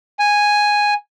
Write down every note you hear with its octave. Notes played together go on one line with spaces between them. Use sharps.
G#5